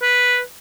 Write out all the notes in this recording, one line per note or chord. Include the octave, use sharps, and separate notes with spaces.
B4